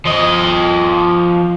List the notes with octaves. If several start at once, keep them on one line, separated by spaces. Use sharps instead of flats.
F3 D#5